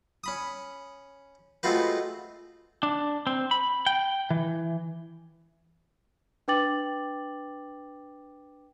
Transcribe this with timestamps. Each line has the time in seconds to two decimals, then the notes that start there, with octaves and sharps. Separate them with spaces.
0.24 C#4 B5 D#6
1.63 G#3 A3 C4 F4 F#4 B4
2.83 D4
3.27 C4
3.51 B5
3.86 G5
4.30 E3
6.48 D4 B4 G5 D6 A6 F#7